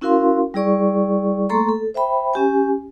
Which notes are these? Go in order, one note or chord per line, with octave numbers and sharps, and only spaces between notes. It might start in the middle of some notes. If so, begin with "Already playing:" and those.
C#4 E4 F#4 A#4 F5 C6
G3 E4 G#4 D5 C#6
A3 A#3 A4 A#5 C6 C#6
A4
C5 E5 G5 B5
C#4 G4 G#5